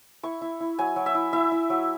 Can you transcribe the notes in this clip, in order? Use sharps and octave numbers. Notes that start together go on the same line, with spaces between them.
E4 C#6
E4
E4
F#3 G#5
F#3
E5
E4
E4 E5
E4
F#3